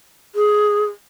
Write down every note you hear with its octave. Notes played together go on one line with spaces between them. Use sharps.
G#4